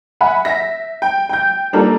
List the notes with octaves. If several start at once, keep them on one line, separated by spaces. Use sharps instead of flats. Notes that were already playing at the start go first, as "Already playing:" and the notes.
E5 F#5 G#5 B5
E5 A#6
G5
G5 G6
G3 A#3 D4 D#4 F4 A4